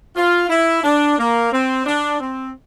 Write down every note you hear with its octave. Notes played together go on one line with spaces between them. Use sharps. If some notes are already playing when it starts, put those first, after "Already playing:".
F4
E4
D4
A#3
C4
D4
C4